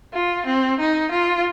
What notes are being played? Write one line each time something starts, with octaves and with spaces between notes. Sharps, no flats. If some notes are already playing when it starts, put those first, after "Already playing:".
F4
C4
D#4
F4